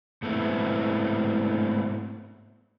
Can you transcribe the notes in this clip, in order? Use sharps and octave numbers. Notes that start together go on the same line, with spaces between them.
G#2 A3 B3 C4 E4